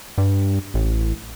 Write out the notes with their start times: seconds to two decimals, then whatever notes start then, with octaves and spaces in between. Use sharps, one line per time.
0.18 G2
0.74 A1